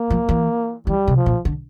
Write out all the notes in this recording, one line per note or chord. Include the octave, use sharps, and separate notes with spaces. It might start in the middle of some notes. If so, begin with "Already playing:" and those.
Already playing: A#3
F3
E3
E3 G3
C3
F3
A#2
D3